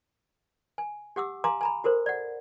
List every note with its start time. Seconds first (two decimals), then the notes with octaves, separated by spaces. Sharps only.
0.78 G#5
1.16 G4 F#5 D6 E6
1.44 F5 G#5 A#5 C6 D6
1.61 G#5 A#5 B5
1.84 F#4 A4 A#4 C5
2.06 D5 F#5